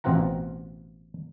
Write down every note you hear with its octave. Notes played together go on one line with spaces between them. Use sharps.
A1 B2 C4 F4 F#5 A#5